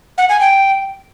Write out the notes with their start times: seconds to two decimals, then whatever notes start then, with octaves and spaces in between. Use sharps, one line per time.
0.18 F#5
0.29 G#5
0.41 G5